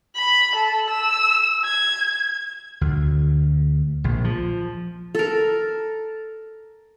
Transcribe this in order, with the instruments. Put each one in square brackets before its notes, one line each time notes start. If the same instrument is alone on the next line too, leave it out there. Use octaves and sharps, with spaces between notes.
[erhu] B5
A4
E6
G#6
[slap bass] D2
A#1
F3
[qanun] A4 A#4